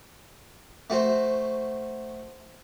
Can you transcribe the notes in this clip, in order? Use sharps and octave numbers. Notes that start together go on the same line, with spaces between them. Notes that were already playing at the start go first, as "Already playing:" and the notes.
A3 F#4 C5